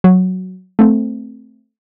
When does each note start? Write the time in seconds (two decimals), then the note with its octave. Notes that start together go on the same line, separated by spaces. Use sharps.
0.04 F#3
0.79 A3 C4